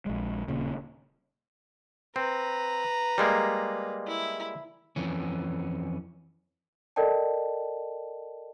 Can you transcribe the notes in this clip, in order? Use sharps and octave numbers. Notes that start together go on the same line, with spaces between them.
A#1 G#3
D#1 A#2 C#3
C4 B4 A#5
G3 G#3 A#3
E4
F2 E3 C#4
A4 A#4 D5 D#5 G5 A5